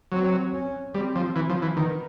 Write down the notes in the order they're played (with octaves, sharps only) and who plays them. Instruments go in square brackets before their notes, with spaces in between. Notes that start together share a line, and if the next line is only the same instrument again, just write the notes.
[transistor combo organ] F#3 [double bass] C4
[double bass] C#4
[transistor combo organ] G3 [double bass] C4
[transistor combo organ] F3
E3
F3
E3
[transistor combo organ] D#3 [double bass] B3